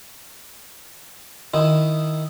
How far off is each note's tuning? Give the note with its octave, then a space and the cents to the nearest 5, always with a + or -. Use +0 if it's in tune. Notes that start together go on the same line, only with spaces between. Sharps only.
D#3 +0 E4 +0 D#5 +0